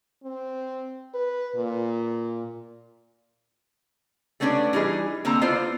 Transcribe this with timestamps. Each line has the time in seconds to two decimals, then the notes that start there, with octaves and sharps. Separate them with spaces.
0.23 C4
1.14 B4
1.56 A#2
4.40 G3 A3 B3 C#4 D4 D5
4.73 E3 G3 D#4 G#4
5.25 D3 A#3 C4 A5 A#5
5.41 B3 E4 F4 C5 D5